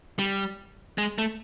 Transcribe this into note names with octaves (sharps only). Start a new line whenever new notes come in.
G3
G#3
A3